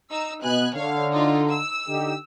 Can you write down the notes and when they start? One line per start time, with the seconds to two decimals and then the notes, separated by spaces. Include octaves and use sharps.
0.11 D#4 E6
0.43 B2 B3 D#5 G#5 F#6
0.75 D3 C#5 F5
1.12 D#4 F4
1.52 E6
1.89 D3 D#4 G4